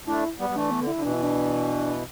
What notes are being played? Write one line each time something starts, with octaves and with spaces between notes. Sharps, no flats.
A3 D4 E4
G3 B3
G3
E3 A3 D4
B3
D3
E4
D3
B2 E3 D4
E4
D4